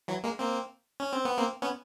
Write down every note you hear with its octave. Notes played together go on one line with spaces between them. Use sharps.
E3 F#3
G#3 A#3
A#3 C4
C#4
C4
B3
A#3 C4
B3 C#4